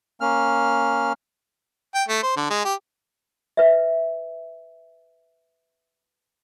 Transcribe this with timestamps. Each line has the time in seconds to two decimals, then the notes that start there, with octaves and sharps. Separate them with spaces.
0.21 A#3 C#4 F6
1.95 G5
2.09 A3
2.23 C5
2.37 D3
2.50 G#3
2.65 G4
3.57 B4 E5